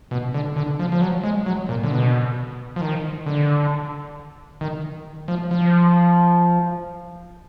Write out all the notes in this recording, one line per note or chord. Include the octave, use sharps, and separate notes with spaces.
B2
D3
D3
F3
F3
F#3
G#3
F#3
A#2
D3
B2
F3
D#3
D3
D#3
F3
F3